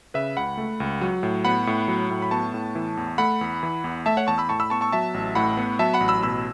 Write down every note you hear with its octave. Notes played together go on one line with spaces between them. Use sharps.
C#3 B4 E5
C#2 F#5 B5
A3
C#2
F#3
A2
B3 F#5 B5
A2
F#3
A2
B5
B3 A5 C#6
A2
E3
E2
A3 F#5 B5
E2
E3
E2
A3 E5 A5
C#5 F#5
E2 A5 C#6
B5 E6
A2 A5 C#6
B5 E6
B3 A5 C#6
A5 C#6
F#3 E5 A5
A1
A2 F#5 B5
B3
F#3 E5 A5
F#5 B5
A1
B5 E6
B2 B5 E6